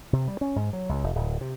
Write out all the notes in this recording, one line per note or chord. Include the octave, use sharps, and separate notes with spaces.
C3
G3
C#4
G#2
F#3
C#2
F1
D1
C3